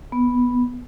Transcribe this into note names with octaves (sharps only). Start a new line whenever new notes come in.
B3